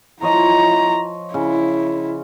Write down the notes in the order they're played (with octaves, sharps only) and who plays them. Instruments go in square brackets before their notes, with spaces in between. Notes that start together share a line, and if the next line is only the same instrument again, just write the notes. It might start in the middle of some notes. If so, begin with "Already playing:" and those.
[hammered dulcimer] F3 C#5 D#5 [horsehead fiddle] E4 A#5
[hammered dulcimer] C#3 [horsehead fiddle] E4